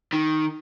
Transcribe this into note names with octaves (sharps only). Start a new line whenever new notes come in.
D#3